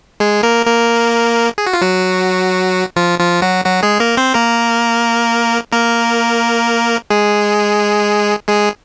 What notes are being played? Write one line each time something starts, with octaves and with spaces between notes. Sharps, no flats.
G#3 G#4
A#3 A#4
A#3 A#4
G#4
F#4
F4
F#3 F#4
F3 F4
F3 F4
F#3 F#4
F#3 F#4
G#3 G#4
A#3 A#4
C4 C5
A#3 A#4
A#3 A#4
G#3 G#4
G#3 G#4